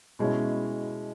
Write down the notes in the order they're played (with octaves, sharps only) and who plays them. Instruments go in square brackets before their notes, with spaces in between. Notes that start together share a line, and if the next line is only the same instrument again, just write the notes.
[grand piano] B2 G#3 C#4 E4